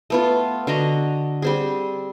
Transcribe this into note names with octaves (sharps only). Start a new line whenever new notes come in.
A3 B3 F4
D3 F#4 D#5 A#5
G3 C4 G#4